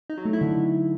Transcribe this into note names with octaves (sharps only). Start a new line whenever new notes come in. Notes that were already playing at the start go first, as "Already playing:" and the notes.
D#4
F#3
A3
E4
D3